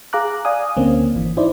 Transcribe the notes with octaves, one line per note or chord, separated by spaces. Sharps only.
G#4 F5 A#5 D6 F#6
D5 F5 G#5 D#6
D2 D3 A#3 C4 C#4
G#1 E3
D#4 E4 C5 D5